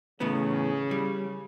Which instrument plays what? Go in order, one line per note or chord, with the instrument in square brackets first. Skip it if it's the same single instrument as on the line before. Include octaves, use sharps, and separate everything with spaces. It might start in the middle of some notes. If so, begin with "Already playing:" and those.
[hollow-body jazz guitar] E2 A2 B3 [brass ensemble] C#3
[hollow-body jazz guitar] G3